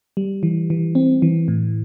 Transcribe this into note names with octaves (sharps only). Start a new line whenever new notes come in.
G3
E3
E3
C4
E3
A2